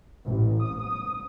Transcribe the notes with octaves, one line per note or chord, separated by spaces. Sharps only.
A1
D#6